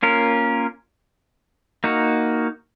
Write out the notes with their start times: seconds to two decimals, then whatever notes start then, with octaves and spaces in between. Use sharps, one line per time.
0.03 A#3 C#4 F4 A#4
1.84 A#3 D#4 F#4